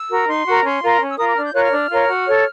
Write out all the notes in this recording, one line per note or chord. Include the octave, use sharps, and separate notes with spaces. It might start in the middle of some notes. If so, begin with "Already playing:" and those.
Already playing: E6
F#4 A#4
D#4 C6
F#4 A#4
C#4 C6
F4 A#4
C#4
E6
F4 A#4 D#6
D6
D4 F6
G6
F4 A#4 C#5 F#6
F6
D4
F4 A#4 C#5
F#4
A4 C#5